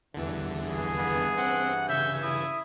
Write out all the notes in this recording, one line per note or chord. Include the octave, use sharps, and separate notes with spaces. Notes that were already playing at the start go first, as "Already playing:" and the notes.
E2 G2 D3 E3
G#4
B3
C4 F#5
C#3 E5 G6 G#6
E4 D#6